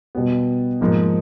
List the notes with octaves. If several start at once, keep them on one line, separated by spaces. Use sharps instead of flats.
B2 G3 B3
G#2 F3 A#3 D#4